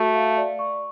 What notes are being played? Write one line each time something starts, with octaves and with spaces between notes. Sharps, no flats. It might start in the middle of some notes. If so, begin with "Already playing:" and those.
Already playing: A3 F#4
F5
D5
C#6